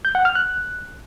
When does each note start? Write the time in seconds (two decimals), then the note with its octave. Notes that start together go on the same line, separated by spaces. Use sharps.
0.05 G6
0.15 F#5
0.25 F6
0.35 F#6